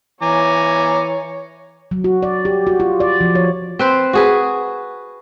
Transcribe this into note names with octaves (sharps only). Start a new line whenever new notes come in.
E3 C#5 G#5 A#5 D6
F#3
F#4
D5
G4
F#4
F4
D5
F3
C#5
C4 B4 C5
F#4 G#4 B4